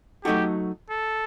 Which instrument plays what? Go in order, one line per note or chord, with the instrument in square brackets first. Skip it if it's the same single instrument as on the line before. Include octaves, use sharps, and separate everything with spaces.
[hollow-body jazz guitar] F#3 A3 D#4 F#4 A4 [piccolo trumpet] G4
[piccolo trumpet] A4